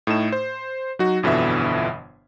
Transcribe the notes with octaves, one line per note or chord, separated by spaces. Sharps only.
A2 A3 D#4 E7
C5
F#3 D#4 F#4
G1 F2 B2 D3 E3 E5